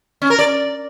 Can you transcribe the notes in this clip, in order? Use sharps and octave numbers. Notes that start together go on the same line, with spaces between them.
C#4
A#4
D5